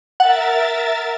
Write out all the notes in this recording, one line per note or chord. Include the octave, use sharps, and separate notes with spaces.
A#4 E5 F#5 A6